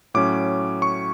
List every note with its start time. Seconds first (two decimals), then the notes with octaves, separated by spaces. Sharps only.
0.14 A2 F#3 C#4 D6
0.82 C#6